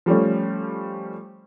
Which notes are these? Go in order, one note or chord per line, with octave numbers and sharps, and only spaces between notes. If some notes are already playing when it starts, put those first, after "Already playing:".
F3 G3 A3 C#4